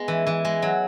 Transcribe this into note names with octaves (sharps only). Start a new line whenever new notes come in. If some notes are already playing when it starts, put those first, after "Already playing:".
Already playing: G#3 B3
E3
E3
G#3
F#3